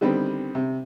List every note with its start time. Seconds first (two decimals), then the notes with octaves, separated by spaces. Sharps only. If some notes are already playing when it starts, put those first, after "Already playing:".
0.01 D3 D#3 G3 B3 C4
0.55 C3